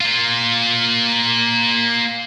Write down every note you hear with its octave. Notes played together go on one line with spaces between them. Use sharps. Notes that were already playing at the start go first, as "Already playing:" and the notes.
A#3 F4